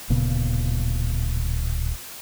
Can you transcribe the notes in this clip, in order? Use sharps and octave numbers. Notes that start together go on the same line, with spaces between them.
D1 A#2 C#3 B3